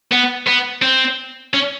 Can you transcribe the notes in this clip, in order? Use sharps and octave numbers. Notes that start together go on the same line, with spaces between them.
B3
B3
C4
C#4